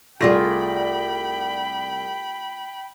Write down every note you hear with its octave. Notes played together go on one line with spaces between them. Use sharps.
C2 A3 F4 G#4 D5 G5 B5 A#6